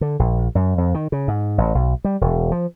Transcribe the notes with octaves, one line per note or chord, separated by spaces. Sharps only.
D3
A#1
F#2
F2
D#3
C#3
G#2
A1
B1
G3
E1
F3